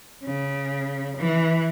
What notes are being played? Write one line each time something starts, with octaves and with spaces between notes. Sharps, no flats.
C#3
E3